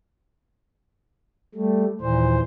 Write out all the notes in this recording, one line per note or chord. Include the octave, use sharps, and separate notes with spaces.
G3 A3
D#2 A#2 E3 C5